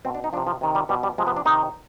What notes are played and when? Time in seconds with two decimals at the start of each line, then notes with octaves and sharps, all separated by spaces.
0.05 B2 C4
0.15 D4
0.24 D#4
0.33 F3 D4
0.37 C3
0.47 F3
0.61 C3 D#3
0.75 G3
0.89 B2 G3
1.03 G3
1.18 C3 F3 G#3
1.27 B3
1.36 D4
1.45 C3 D#3 D#4